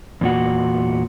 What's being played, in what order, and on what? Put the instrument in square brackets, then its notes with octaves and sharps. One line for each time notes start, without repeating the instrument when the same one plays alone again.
[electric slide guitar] E2 A#2 F#4